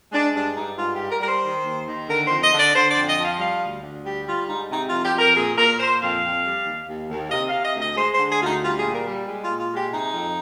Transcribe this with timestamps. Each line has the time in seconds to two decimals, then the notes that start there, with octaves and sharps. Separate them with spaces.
0.12 G#3 D4
0.34 G2 D4
0.55 G2 D#4
0.78 G#2 F4
0.95 G4
1.00 G3
1.10 A#4
1.21 G3 A#4
1.27 C5
1.43 D#3
1.64 D#2
1.87 D#3
2.08 D3 A#4
2.25 F2 C5
2.41 D#5
2.52 D3 D5
2.74 D3 C5
2.90 D5
2.96 F2
3.07 D#5
3.17 F3
3.22 F5
3.39 G3 F5
3.61 D2
3.82 D2
4.04 G3 G4
4.25 G3 F4
4.47 G#2 D#4
4.70 C3 D#4
4.87 F2 F4
5.02 G4
5.13 F2
5.19 A#4
5.35 A#2 G#4
5.56 A#2 A#4
5.78 A#2 C5
6.01 F2 F5
6.22 F2
6.44 G3
6.66 D#2
6.87 D#2
7.09 D#2
7.27 F5
7.31 C3 D#5
7.47 C3 F5
7.63 D#5
7.74 D2
7.80 D#5
7.96 G#3 C5
8.13 C5
8.18 D3
8.29 G#4
8.40 D2 F4
8.45 D#4
8.62 G3 F4
8.78 A#2 G#4
8.94 A#4
9.05 G3
9.27 G#3
9.42 F4
9.49 A#2
9.60 F4
9.71 G#3
9.76 G4
9.92 C3 D#4
10.13 F2